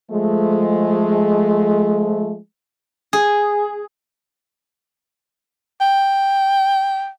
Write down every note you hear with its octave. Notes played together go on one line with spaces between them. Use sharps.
F3 G#3 A3
G#4
G5